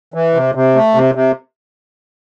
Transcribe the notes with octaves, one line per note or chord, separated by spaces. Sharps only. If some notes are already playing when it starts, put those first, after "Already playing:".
E3
C3
C3
A3
C3
C3